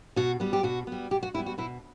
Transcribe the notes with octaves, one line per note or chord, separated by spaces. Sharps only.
B2 F#4
G3 B3
G4
B2 F#4
G3 B3
B2 G4
F#4
G3 B3 E4
F#4
B2 E4